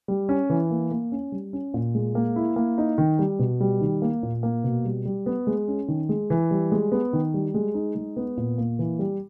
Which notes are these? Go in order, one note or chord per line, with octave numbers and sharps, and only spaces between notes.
G3
C#4
E3
A#3
A#3
C#4
G3
C#4
A#2
G#3
A#3
E4
A#3
D#4
D#3
G3
B2
G3
D#3
A#3
A#2
A#3
B2
G3
G3
B3
G#3
C#4
D#3
G#3
E3
G3
G#3
B3
D#3
G3
G#3
D#4
G#3
B3
A#2
A#3
E3
G3